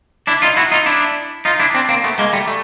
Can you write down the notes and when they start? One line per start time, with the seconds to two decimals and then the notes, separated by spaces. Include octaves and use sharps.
0.27 D4 E4
0.42 D#4 F4
0.57 E4 F#4
0.72 D#4 F4
0.86 D4 E4
1.45 D#4 F4
1.60 D4 E4
1.74 C4 D4
1.89 A#3 C4
2.04 A3 B3
2.19 G#3 A#3
2.33 G3 A3
2.48 A3